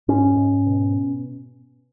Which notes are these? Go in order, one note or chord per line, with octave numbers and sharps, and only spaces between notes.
G#2 C#4
G#2
B2